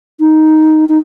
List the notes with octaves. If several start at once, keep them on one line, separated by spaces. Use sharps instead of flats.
D#4
D#4